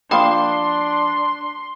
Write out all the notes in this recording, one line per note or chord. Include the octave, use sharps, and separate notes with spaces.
F3 A#3 D4 F5 G5 B5 C6 D#6